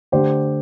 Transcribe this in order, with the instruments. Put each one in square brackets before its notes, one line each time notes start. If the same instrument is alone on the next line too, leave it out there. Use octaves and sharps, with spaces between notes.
[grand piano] D3 A3 G4 C5